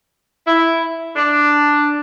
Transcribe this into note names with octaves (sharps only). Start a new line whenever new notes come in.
E4
D4